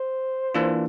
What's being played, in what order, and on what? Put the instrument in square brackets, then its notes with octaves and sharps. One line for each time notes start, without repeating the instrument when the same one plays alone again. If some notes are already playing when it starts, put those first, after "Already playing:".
Already playing: [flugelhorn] C5
[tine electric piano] E3 A#3 D4 F4